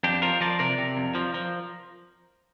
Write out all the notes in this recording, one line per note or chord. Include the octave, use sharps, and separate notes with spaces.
F2 D4 G4
F3 F4 A#4
F3 A#4 D5
C3 A#4 D5
C3
F2
F3
F3